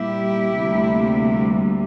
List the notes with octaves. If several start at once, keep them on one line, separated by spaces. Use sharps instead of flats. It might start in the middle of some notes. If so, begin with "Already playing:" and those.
Already playing: A#2 G3 A#3 E4 G4
D2 C3 G3 A#3